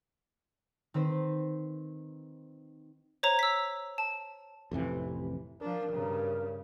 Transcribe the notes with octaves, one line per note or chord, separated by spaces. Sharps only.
D#3 C4 B4 C5
C5 C#5 A#5
E6 B6
A5
A1 F2 C3 E3
F3 D4 A#4
G2 C#3